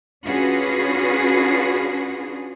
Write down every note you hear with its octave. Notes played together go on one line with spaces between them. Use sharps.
C#4 D4 F4 F#4 G#4 B4